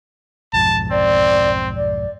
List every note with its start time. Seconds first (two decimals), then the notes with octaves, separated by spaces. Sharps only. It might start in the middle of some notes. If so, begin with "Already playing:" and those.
0.53 B1 F2 G#2 A5
0.91 C4 D5
1.76 D5